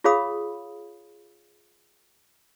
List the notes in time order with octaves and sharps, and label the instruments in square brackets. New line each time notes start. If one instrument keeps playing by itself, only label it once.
[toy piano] F4 G#4 C#5 F5 B5 D#6